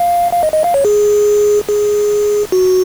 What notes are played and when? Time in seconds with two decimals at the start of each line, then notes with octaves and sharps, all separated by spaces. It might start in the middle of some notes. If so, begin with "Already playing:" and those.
Already playing: F5
0.33 F5
0.43 D#5
0.53 D#5
0.64 F5
0.74 C#5
0.85 G#4
1.69 G#4
2.52 F#4